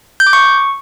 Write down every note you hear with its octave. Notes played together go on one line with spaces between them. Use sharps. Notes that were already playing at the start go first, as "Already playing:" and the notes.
G6
D6
C#6